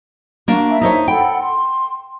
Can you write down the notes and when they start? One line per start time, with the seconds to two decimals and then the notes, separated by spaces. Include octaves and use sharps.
0.48 A#3 D4 F#4
0.68 E4 E5 A5
0.81 D#4 C5 C#5
1.08 A4 F#5 G5 B5
1.38 C6